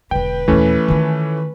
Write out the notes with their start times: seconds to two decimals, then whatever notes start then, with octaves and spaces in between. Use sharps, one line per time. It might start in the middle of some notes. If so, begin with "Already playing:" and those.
0.11 E1 D3 B4 G5
0.48 D#2 A#2 E3 A3 C#4
0.88 D#3 F4